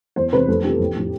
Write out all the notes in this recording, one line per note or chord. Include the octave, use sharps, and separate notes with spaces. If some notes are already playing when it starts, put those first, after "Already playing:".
E2 C5
C3 E3 B4
F1 A4
E2 C3 F3 G4
A1
A2 F3